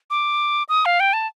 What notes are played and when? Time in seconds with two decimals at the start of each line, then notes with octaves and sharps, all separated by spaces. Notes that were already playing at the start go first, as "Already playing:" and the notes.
0.10 D6
0.69 D#6
0.85 F5
1.00 G5
1.13 A5